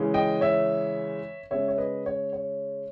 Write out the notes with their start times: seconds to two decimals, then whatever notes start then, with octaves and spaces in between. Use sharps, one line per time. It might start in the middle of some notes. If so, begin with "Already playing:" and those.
Already playing: C#3 E3 G#3 C#4
0.14 D#5 G5
0.41 C#5 E5
1.51 C#3 G#3 C#4 C#5 E5
1.68 C#5
1.78 B4 D#5
2.06 C#5
2.33 C#5